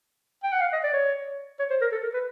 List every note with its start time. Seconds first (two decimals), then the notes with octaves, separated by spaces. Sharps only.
0.43 G5
0.53 F#5
0.61 F5
0.73 D#5
0.84 D5
0.93 C#5
1.59 C#5
1.70 C5
1.81 A#4
1.92 A4
2.03 A#4
2.14 B4